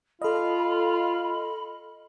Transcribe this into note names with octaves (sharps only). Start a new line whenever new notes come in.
F4 A4 D#5 B5